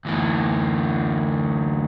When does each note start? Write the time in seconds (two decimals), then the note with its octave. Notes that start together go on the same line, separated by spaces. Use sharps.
0.05 D2 E3